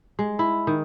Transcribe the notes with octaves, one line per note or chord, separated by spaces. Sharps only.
G#3
E4
D#3